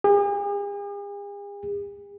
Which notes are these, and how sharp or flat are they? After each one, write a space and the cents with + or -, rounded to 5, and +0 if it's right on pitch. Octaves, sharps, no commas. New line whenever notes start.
G#4 -45